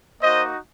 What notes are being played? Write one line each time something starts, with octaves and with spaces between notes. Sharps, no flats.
A#3 D#4 F#4 C5 D#5